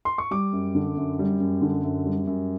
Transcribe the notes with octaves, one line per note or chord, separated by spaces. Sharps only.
C6
C#6
G3 D6
F#2
D3
F#2
G3
F#2
D3
F#2
G3
F#2